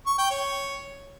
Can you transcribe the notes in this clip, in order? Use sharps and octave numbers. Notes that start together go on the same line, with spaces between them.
C#6
G5
C#5